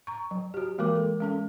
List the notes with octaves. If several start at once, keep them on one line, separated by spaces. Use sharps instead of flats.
A#5 C#6
F#3
F#4 G4
E3 G#3 A#3 A#4 D6
A4
G#3 C#4 A4